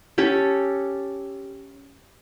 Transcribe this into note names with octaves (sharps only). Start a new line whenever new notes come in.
C#4 G4 A4 C#5